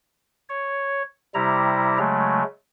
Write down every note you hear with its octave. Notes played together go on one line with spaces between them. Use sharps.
C#5
C3 G3 E4 A#5
C#3 F#3 G#3 A3